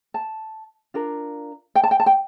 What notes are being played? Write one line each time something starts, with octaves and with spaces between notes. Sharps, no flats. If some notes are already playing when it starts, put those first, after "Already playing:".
A5
D4 F4 A#4
G5
A5
G5
A5
G5